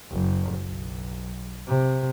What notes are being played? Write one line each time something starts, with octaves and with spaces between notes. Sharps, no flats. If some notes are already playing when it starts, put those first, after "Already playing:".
F#1
B1
C3